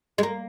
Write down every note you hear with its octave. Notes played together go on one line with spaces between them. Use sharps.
G#3
A#3